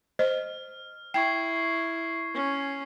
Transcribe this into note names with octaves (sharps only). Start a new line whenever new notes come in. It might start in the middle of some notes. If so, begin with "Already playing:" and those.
C5 D#5 F6
E4 G5 C#6 G#6 C7
C#4